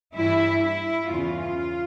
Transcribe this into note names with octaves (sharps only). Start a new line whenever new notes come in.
G2 E3 E4
E4
E2 C#3 E3 F4